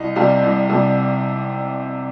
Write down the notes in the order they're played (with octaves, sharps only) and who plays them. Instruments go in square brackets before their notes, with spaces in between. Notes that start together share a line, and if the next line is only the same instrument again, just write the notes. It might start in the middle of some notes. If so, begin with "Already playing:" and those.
Already playing: [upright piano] C2 D#5
C3 G3 F5
C2
C3 G3